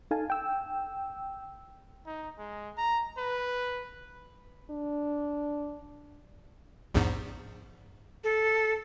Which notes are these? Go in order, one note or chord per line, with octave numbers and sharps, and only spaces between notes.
D#4 A4 F5 G#5 A5
G5 E6
D#4
G#3
A#5
B4
D4
A#1 E2 G#2
A4